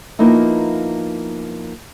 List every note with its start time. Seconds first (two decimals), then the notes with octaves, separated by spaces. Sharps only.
0.19 F3 A#3 B3 D#4 E4